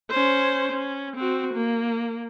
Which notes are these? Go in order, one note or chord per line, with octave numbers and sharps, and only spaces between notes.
C#4 C5
C#4
C4 F#4
A#3